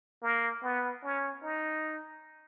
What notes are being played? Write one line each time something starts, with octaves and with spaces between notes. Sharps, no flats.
A#3
B3
C#4
D#4